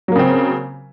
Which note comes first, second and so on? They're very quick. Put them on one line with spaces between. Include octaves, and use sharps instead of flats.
F#3 A#3 C#3 C4